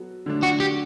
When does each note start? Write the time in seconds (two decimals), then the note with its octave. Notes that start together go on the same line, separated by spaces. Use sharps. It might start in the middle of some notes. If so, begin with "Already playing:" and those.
Already playing: F#3 B3 F#4 A4
0.26 D3 F#3 A3 D4
0.43 F#4
0.60 G4